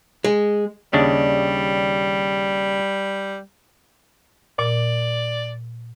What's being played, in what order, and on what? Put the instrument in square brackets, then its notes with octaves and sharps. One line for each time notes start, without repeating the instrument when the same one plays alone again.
[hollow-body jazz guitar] G#3
[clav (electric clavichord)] D#2 C#3 D4 [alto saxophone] G3
[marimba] A#2 [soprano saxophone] D5